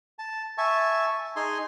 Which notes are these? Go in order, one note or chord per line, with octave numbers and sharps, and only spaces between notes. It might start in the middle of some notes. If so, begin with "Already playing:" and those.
A5
E5 G#5 A5 C#6
D#4 G#4 G#5 C6